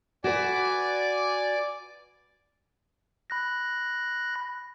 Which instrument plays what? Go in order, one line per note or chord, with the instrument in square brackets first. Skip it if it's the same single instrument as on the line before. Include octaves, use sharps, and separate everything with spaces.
[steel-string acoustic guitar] F#4 B4 [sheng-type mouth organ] D5 G#5 D6
[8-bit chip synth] B5 F#6 A#6